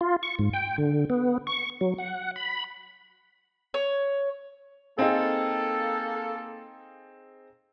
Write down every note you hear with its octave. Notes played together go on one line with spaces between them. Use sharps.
F4
C#6
G#2
G5
D3
B3
C#6
F#3
F#5
B5
C#5
A#3 C4 D#4 G#4 A4